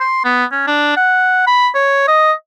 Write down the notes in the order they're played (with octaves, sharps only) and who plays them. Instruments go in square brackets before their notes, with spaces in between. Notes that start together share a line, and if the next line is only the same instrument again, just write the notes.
[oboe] C6
B3
C#4
D4
F#5
B5
C#5
D#5